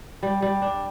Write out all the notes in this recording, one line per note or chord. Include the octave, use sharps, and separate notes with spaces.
G3
G3
D4